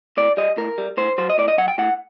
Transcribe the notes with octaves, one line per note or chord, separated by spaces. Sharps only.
A2 D5
G3 D#5
A2 A#4
G3
A2 C5
F#3 C5
D#5
A2 D5
D#5
F#3 F#5
G5
A2 F#5